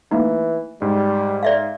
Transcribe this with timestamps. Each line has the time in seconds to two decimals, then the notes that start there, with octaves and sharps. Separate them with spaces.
0.11 E3 A3 A#3 D#4
0.82 G#2 G3
1.43 D5 E5 F5